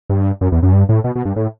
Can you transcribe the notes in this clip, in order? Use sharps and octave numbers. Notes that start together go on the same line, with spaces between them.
G2
F#2
E2
F#2
G2
A2
B2
B2
G2
A2